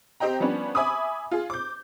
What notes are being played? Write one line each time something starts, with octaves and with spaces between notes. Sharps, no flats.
C4 G4 D#5 G5 A#5
F3 G3 B3 C#4 D4
E5 G#5 B5 D6 D#6
F4 G#4
D6 G6